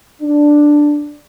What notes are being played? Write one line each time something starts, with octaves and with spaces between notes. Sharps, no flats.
D4